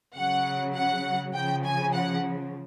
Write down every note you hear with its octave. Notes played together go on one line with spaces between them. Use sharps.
C#3 F#3 F#5
F#5
C#3 F3 G5
G#5
F#5